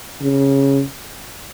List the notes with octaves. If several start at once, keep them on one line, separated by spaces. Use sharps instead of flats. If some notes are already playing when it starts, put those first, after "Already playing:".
C#3